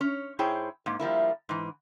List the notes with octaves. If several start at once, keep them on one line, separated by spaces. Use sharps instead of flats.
C#4 C#5
G#2 E4 G#4 C5 C#5 G5
G#2 A#3
F3 G3 A#3 E4
G#2 E3